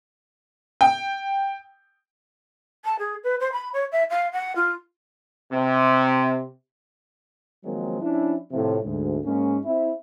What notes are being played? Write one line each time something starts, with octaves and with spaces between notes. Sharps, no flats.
G5
A5
G#4
B4
C5
B5
C#5
E5
F5
F#5
F4
C3
D#3 F3 F#3 G#3 A#3 C4
F3 C#4 D4 E4
A2 C3 F3
D2 G#2 D3
G#2 G#3 A#3 C#4
C4 E4